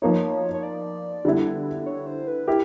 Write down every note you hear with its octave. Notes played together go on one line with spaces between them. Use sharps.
F3 A#3 D#4 C#5
C#5
D5
D3 G3 B3 E4
C#5
C5
B4
E4 G4 A#4